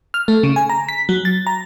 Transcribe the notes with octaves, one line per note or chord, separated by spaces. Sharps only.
F6
A3
C#3
G#5
A#5
B6
F#3
A6
A#5